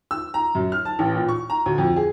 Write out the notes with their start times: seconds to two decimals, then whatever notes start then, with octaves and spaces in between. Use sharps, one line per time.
0.11 E6
0.34 A#5
0.55 F#2
0.72 F6
0.85 A5
0.99 A1
1.16 A#2
1.29 C#6
1.50 A#5
1.66 D2
1.78 F2
1.96 G#4